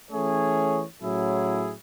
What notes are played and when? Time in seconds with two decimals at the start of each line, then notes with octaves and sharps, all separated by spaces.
0.11 E3 A3 C#4 G#4 C#5
1.01 A2 F#3 C#4 E4 G#4